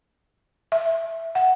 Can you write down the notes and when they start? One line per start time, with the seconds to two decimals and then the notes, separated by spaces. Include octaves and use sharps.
0.72 E5
1.35 F#5